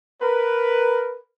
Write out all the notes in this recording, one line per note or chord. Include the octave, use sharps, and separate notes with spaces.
A#4 B4